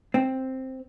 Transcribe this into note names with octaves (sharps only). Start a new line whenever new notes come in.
C4